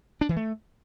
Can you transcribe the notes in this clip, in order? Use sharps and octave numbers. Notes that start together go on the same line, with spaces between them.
D4
E3
A3